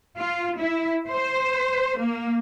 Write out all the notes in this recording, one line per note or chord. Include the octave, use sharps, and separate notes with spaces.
F4
E4
C5
A#3